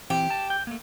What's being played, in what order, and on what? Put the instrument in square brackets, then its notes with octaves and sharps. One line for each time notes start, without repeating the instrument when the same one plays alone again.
[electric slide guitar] E3 C4 [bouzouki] G4
[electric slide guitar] A5
G5
A3 A#3